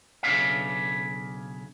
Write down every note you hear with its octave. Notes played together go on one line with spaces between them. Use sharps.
B1 C#3 D4 C#5 E5 F5